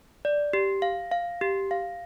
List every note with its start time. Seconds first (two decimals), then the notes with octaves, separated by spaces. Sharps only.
0.25 D5
0.53 G4
0.82 F5
1.12 F5
1.41 G4
1.71 F5